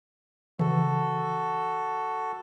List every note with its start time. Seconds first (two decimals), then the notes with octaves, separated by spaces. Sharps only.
0.59 C#3 E3 F#4 A4